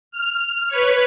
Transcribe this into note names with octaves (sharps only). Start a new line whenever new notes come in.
F6
B4 C#5